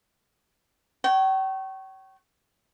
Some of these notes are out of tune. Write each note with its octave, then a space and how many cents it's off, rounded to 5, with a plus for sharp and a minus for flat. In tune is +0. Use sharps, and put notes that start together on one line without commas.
C#5 -10 G5 -40